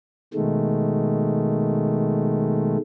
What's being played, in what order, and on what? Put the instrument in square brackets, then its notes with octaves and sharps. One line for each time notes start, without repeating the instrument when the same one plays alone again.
[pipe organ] B2 D#3 G#3 A3